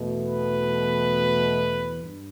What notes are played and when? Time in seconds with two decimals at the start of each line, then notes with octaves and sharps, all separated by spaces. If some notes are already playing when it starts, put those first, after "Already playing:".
Already playing: E2 B2 A3
0.22 B4
2.01 G2